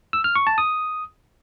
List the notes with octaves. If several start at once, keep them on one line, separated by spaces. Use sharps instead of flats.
E6
F6
C#6
A5
D#6